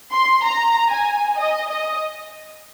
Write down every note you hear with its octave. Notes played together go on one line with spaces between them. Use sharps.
C6
A#5
G#5
D#5
D#5